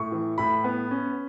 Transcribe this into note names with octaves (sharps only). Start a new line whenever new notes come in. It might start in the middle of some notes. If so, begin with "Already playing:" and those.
Already playing: A2 C#6
E3
A2 B5
B3
C#4